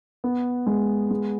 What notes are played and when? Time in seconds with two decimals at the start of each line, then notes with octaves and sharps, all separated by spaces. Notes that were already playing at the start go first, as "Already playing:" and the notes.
0.24 B3
0.66 G#3
1.11 G#3